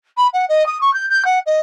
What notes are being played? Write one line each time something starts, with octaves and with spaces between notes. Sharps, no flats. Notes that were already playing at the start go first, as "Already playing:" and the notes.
B5
F#5
D#5
D#6
C#6
G6
G6
F#5
D#5